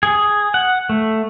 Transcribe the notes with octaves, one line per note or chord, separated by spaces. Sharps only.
G#4
F#5
A3